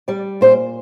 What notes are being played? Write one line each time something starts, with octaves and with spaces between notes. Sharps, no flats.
G3 D5
A#2 C5